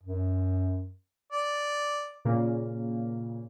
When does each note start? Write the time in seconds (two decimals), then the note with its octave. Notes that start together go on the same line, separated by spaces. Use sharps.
0.03 F#2
1.33 D5
2.25 A#2 C#3 A#3